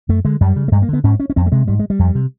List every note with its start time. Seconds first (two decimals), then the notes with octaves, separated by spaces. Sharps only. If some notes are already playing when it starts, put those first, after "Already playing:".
0.09 F#2 A3
0.25 D3 G#3
0.41 F#2 G3
0.56 C#3
0.68 A3
0.72 G2 G#3
0.82 A#3
0.89 D3 B3
1.04 G#2 C#4
1.20 C#4
1.30 C#4
1.36 F2 C4
1.46 A3
1.52 C3 G#3
1.68 G#2 G3
1.79 G#3
1.90 G3
1.99 F2
2.15 C3